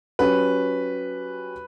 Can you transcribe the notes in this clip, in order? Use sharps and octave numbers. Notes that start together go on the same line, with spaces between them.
F#3 C#4 G4 B4